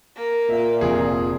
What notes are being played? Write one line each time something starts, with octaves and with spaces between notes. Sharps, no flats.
A#3
A#2 E5
F1 F3 G#4